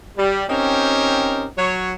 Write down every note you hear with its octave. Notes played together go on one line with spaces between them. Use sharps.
G3
C4 C#4 D#4 G4 A#4
F#3 C#5